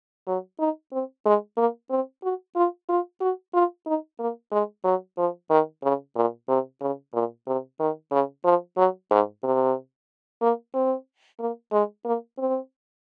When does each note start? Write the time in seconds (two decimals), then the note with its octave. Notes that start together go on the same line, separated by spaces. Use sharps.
0.27 F#3
0.59 D#4
0.92 C4
1.25 G#3
1.57 A#3
1.90 C4
2.23 F#4
2.56 F4
2.89 F4
3.21 F#4
3.54 F4
3.86 D#4
4.19 A#3
4.52 G#3
4.84 F#3
5.17 F3
5.50 D#3
5.83 C#3
6.15 A#2
6.48 C3
6.81 C#3
7.13 A#2
7.47 C3
7.79 D#3
8.11 C#3
8.44 F3
8.77 F#3
9.11 G#2
9.43 C3
10.41 A#3
10.74 C4
11.40 A#3
11.72 G#3
12.05 A#3
12.38 C4